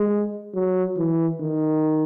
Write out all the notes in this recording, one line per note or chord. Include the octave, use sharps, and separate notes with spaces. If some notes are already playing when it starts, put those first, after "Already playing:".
Already playing: G#3
F#3
E3
D#3